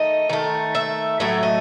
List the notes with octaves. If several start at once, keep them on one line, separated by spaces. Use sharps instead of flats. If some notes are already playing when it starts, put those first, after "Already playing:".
Already playing: D#3 A3 D#5
D#3 A3
E5
A2 F#3 A3 E5
D#5